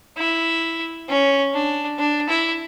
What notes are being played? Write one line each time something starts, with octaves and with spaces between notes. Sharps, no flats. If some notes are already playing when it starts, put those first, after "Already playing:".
E4
C#4
D4
D4
E4